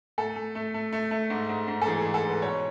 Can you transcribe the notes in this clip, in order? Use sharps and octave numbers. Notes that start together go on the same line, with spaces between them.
A3 A4
A3
A3
A3
A3
A3
G#2
G#2
G#2
A4
E3 G#4
G#2 G#4
A4
G#2
B4
B2 C#5